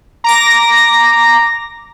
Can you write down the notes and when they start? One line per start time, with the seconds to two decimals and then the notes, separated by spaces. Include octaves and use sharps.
0.24 A#5 D6 A#6